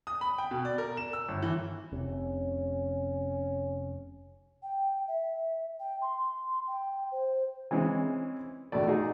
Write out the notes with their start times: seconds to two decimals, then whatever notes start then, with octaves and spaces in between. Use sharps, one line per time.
0.07 D#6
0.21 B5
0.38 G5
0.51 B2
0.65 D5
0.78 A#4
0.97 E7
1.13 E6
1.28 G1
1.43 E3
1.92 F1 C3 C#4
4.62 G5
5.07 E5
5.79 G5
6.01 C6
6.67 G5
7.11 C5
7.71 E3 G#3 C4 C#4 E4
8.72 A#1 B2 A3 D5
8.88 D#4 F#4 G#4